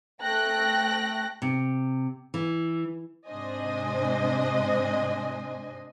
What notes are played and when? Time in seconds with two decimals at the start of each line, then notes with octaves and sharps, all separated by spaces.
0.22 A3 G5 F#6 A#6
1.42 C3
2.34 E3
3.28 G#2 C3 D4 C5 D#5 G#5